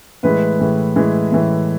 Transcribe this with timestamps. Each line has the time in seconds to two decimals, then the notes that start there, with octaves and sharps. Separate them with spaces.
0.23 A2 E3 G#3 B4
0.59 A2 E3 G#3
0.96 A2 E3 G#3
1.32 A2 E3 G#3